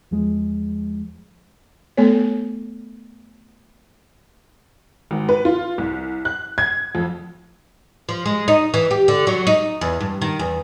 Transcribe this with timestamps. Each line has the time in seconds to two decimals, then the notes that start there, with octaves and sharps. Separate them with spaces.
0.11 E2 F3 G#3
1.97 A3 B3 A4 C#5
5.11 G#1
5.29 B4
5.45 F4
5.78 C2
6.25 F#6
6.58 G#6
6.95 F2
8.09 F3
8.26 G#3
8.48 D#4
8.74 E3
8.91 G4
9.08 D3
9.27 F#3
9.47 D#4
9.81 E2
10.01 G2
10.22 D#3
10.39 E2